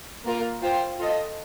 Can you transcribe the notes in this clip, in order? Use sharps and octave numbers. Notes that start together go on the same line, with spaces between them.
A#3 F4 A#4
F4 C5 G5
F4 A4 D#5